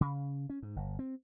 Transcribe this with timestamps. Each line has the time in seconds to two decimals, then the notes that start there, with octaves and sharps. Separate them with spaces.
0.01 C#3
0.50 C#4
0.62 G#2
0.76 G1
0.99 C4